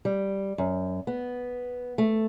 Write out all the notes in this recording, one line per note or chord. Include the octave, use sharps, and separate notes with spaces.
G3
F#2
B3
A3